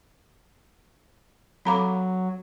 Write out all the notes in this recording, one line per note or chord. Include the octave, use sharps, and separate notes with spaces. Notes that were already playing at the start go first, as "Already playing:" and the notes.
F#3 C4 A4 F5 A#5 B5 D6